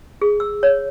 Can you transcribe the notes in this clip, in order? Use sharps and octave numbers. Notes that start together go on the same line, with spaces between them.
G#4
E6
C#5